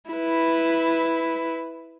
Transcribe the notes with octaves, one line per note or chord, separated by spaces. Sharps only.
E4 B4